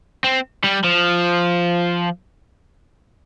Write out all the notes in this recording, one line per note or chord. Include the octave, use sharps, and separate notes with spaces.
C4
G3
F3